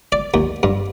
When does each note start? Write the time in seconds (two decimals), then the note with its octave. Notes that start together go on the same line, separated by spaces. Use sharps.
0.12 D5
0.34 D#2
0.63 G2